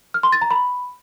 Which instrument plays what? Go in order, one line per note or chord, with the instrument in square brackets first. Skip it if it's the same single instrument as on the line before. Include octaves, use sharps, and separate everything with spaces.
[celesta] F6
C6
A6
A#5
B5